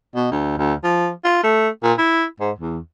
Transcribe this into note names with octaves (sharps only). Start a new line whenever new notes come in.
B2
D2
D2
F3
F4
A3
A#2
E4
G#2
E2